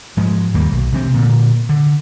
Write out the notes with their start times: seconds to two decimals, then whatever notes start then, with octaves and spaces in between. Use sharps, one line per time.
0.17 G#2 F3 G#3
0.54 D#2 G3 A#3
0.72 B1
0.92 C3 E3 B3 C4
1.14 A#2 D3
1.69 D3